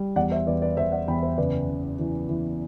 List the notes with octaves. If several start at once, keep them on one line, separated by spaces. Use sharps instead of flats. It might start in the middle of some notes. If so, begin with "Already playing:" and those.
Already playing: G3
E2 D5 F#5
C5 E5
E2 B4 D5
B4 D5
E2 C5 E5
D5 F#5
E2 G5 B5
C5 E5
F#1 B4 D5
F#1
E3
E3